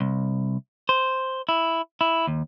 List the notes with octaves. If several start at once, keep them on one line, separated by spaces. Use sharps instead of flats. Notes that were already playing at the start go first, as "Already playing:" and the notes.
C2
C5
E4
E4
D#2